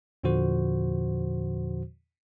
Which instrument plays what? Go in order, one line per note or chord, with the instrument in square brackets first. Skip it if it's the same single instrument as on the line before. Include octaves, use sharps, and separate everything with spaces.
[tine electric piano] E2 A#2 D3 F3 F#4 C5